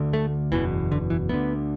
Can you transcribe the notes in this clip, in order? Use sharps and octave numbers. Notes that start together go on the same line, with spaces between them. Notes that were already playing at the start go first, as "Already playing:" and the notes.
Already playing: D2 D3
A3
F#1 E2 B2 E3
D3
E3
D2 D3 B3